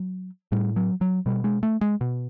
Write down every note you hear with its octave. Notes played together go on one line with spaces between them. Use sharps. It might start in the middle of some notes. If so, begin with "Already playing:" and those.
Already playing: F#3
A2 G3
F#3
F#3
B2 G3
G#3
A3
G#3
B2